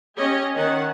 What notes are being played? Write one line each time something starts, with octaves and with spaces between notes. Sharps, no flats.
C#4 G4 C#5 D#5
D#3 C#4 F#5